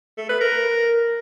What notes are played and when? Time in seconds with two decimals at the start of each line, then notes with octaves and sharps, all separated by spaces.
0.17 A3
0.29 B4
0.40 A#4